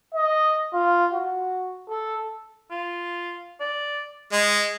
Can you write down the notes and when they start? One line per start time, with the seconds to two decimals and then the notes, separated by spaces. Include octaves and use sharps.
0.14 D#5
0.74 F4
1.13 F#4
1.89 A4
2.71 F4
3.61 D5
4.32 G#3 D#5